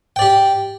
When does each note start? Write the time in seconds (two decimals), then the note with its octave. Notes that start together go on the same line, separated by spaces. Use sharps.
0.16 G5
0.19 D5
0.22 G4